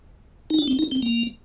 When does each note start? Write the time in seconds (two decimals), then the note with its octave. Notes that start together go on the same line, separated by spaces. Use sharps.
0.50 D#4
0.58 D4
0.68 C4
0.79 D#4
0.91 C4
1.03 A#3